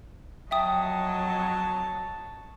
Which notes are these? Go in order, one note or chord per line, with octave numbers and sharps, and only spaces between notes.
F2 F#3 C#5 D#5 E5 G5 A5 D#6